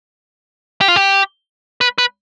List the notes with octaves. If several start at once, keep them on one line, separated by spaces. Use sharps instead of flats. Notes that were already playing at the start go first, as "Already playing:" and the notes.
G4
F4
G4
B4
B4